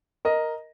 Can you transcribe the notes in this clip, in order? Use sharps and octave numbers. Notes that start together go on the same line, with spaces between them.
A#4 D#5